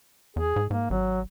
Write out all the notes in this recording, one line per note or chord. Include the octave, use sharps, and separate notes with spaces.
E2 G#4
G#2
G#2 A#3
G#1 F#3